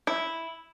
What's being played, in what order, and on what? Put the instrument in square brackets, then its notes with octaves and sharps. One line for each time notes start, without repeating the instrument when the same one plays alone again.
[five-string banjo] E4